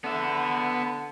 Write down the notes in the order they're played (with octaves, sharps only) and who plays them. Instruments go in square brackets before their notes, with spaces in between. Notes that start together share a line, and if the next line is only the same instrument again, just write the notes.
[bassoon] D3 [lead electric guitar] B3 E5